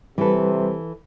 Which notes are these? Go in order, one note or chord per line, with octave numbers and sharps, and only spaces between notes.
C3 E3 G3 A4 B4